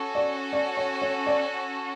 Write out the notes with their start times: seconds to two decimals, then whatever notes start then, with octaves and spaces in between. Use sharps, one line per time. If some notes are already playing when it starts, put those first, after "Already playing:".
Already playing: C#4 F#4 A4
0.15 D5
0.53 D5
0.77 C#5
1.02 C#5
1.27 D5